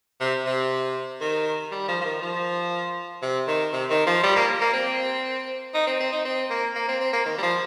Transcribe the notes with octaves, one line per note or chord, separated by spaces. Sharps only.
C3
C3
D#3
G3
F3
F3
D#3
F3
C3
D#3
C3
D#3
F3
G3
A#3
A#3
C4
D#4
C4
C4
D#4
C4
A#3
A#3
C4
C4
A#3
D#3
G3
F3